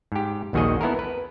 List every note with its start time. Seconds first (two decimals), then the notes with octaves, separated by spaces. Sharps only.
0.12 G#2 G4
0.53 A#1 D#2 D#3 F#4 G#4 D#5
0.81 B3 E4 A4 A#4
0.99 B4